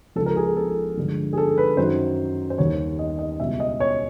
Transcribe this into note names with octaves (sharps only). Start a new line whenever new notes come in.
C#2 C#3 F3 A4
A#4
G#4
A4
A4
G2 D3 F3 G#3
G#4
A4
B4
F#2 D#3 F#3 C5
C5
D#2 D#3 G3 C#5
D#5
D#5
C#2 B2 G3 E5
D#5
C#5